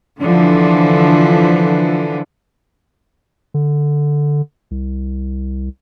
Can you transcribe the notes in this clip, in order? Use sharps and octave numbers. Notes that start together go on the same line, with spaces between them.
D3 E3 F3
D3
C2